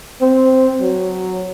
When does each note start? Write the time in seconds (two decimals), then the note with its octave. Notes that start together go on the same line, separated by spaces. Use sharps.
0.21 C4
0.81 F#3